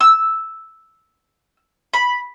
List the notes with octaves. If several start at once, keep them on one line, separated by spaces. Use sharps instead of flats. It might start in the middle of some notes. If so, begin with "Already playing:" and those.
E6
B5